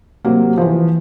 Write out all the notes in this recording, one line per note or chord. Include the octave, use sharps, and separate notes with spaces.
C3 F#3 A#3
E3 F3